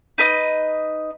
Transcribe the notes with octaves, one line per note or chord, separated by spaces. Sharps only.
D#4 B4 D#5